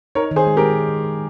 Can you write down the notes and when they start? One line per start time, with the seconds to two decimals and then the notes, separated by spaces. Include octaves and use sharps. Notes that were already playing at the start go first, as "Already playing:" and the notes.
0.15 D#4 A#4 C#5
0.31 D#3
0.36 G#4 C5
0.47 G#3
0.57 G4 A#4
0.61 G#3